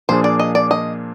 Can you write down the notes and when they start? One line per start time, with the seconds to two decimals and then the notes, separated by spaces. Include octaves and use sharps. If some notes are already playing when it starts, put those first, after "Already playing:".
0.09 A#2 F3 A#3 D4 G#4 C5
0.24 D5
0.40 D#5
0.55 D5
0.71 D#5